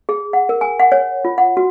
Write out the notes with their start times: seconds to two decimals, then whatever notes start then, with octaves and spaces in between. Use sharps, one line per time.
0.09 G#4
0.33 F#5
0.49 A#4
0.61 G#5
0.79 F#5
0.92 C#5
1.25 F4
1.38 F#5
1.57 F#4